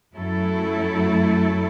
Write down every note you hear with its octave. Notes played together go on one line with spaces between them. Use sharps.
F#2 F#3 A3 E4 A4